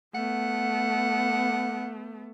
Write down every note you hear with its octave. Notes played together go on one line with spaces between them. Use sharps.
A3 B3 F#5